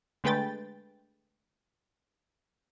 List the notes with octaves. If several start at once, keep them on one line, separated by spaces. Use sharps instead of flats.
D3 G#3 A3 B4 G5 A6